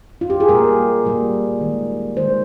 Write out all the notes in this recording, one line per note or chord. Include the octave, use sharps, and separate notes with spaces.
F4
G4
G#4
A#2 G3 A#3 A#4
A#2 G3 A#3
D#3 G#3
D#3 G#3 C5